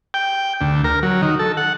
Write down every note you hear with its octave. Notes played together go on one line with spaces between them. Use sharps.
G5
D2
A#4
F#3
D#3
A4
F#5